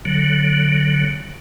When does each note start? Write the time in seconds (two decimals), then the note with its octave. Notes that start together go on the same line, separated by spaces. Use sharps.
0.05 D3 F#3